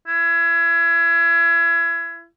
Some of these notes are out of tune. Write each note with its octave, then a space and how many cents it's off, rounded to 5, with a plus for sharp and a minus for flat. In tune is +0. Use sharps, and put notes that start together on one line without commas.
E4 +35